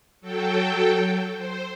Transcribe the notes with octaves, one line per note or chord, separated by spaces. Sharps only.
F#3 A4 G5
C5